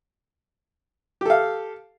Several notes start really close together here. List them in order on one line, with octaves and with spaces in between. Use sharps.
G4 A4 F5